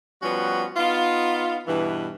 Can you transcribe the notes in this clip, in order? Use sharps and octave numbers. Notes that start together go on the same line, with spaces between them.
F3 G3 B3 C#4 F#4
B3 D#4 F4
G2 B2 E3